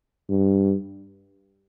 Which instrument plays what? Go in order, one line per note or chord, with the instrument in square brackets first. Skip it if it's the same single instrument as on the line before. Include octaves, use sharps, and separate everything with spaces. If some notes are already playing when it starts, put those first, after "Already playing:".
[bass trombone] G2